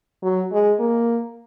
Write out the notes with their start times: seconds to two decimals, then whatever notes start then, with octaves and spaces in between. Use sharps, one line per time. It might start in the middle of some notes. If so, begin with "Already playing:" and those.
0.23 F#3
0.52 G#3
0.80 A#3